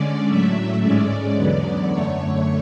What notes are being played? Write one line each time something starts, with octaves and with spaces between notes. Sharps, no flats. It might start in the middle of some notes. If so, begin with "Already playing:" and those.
Already playing: D3 G#3 C#4 D5
A2 F#3 A3 E5
G#2 G#3 C#4 D5
E2 D3 F#3 B3
F#2 D3 A3 C#5